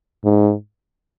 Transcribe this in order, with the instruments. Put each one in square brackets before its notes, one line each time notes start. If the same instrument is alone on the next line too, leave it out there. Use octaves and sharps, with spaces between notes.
[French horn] G#2